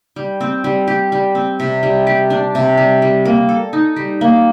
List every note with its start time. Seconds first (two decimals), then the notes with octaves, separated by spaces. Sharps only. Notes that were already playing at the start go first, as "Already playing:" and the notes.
0.16 G3
0.41 C4
0.64 G3
0.88 G4
1.12 G3
1.35 C4
1.60 C3
1.83 G3
2.07 G4
2.30 D4
2.55 C3
2.77 G3
3.02 G3
3.25 A#3
3.49 A4
3.73 D#4
3.96 G3
4.21 A#3